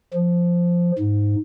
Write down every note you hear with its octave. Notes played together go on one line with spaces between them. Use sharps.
F3
G#2